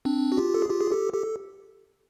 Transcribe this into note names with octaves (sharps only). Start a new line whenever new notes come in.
C4 D4
F#4
F4 G4
A4
G#4
F4 G4
G#4
G4 A4
G4 A4